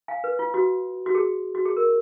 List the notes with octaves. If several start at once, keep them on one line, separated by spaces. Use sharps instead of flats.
F5 G#5
B4
F4
F#4
F#4
G#4
F#4
G#4
A#4